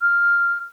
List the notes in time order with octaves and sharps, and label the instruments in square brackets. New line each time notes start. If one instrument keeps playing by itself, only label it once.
[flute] F6